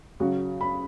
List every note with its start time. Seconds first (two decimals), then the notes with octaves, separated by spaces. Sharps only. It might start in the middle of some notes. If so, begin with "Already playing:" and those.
0.20 C#3 F#3 F#4
0.61 B5